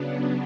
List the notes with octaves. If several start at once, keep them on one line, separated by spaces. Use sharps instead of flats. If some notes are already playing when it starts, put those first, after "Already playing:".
Already playing: C#3 F#3 B3 D4